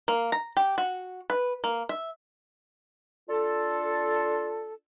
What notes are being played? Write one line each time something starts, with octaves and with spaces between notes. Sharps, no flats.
A#3
A#5
G4
F#4
B4
A#3
E5
D4 F4 A4